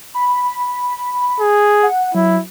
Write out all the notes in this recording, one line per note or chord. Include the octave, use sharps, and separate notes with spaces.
B5
G#4
F#5
F#3 E4